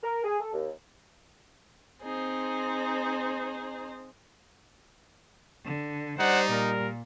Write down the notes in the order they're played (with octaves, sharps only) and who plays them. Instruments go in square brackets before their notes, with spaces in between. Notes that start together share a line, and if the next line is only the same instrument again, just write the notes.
[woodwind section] A#4
G#4
A4
D#2
[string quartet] C4 D#4 G#4 C5
[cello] D3
[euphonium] G3 [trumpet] D#4 [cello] C5 D5 [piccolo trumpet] F#5
[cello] A#2 [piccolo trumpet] A#4